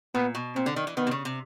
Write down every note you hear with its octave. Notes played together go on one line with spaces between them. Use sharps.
A#2 B3
B2
A#2 C4
D3
D#3
E3
D#3 B3
C3
C#3
C3